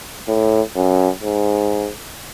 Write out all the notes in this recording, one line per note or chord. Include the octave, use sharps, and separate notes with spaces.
A2
F#2
G#2